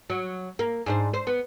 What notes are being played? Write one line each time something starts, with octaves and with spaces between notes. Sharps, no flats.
F#3
A#3
G#2 D4 C5
C5
B3